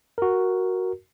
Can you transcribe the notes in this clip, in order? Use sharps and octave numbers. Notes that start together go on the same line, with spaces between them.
F#4 A#4